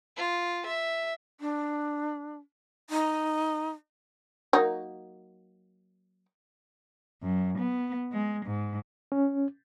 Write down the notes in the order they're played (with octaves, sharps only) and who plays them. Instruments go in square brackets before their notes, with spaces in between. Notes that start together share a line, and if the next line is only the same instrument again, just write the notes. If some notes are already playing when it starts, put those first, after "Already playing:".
[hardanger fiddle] F4
E5
[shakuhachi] D4
D#4
[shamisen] F#3 A#3 D#4
[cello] F#2
B3
G#3
G#2
[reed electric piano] C#4